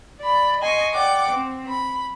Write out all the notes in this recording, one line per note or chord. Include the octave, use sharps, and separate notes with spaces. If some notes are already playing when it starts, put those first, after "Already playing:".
D5 B5
D#5 G#5 C6 C#6
D5 F#5 G5 D6
C4
B5